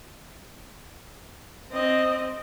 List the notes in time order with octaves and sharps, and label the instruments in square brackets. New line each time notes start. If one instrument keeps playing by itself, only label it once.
[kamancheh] C4 D#5